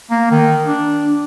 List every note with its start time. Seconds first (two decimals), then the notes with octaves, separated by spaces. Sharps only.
0.10 A#3
0.31 D#3
0.65 D4